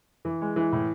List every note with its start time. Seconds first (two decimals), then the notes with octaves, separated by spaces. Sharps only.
0.25 E3
0.41 G#3
0.56 E3
0.72 A2